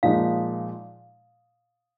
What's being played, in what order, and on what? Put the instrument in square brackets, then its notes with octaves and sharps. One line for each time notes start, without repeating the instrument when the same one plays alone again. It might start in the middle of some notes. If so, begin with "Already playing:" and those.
[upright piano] A#2 F3 G#3 D#4 [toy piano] F5